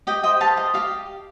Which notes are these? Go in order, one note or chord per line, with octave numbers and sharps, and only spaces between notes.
G4 D#5 G5
C5 D#5 G5
G4 F5 A5
D#5 F5
G4 F5